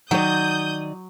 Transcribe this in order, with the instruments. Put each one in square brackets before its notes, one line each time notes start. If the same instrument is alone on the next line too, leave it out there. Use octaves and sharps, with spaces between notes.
[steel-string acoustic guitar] D#3 D#4 D5 [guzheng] F#3 [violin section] D#6 G6